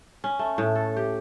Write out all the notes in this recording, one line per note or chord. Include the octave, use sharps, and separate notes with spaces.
C#4
A3
A2
A4
G4